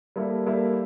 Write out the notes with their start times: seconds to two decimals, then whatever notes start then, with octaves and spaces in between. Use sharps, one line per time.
0.16 G3 A#3 E4 A4
0.46 G3 A#3 E4 A4